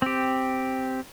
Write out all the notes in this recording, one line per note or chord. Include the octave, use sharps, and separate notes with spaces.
C4 G4